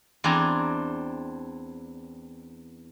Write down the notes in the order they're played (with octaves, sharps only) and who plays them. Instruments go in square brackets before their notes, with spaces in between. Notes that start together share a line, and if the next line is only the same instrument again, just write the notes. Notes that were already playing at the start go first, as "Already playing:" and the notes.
[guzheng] E2 C4 D4 G#5 A#5